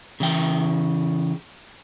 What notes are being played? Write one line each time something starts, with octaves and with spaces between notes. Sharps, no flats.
C#3 E3 G5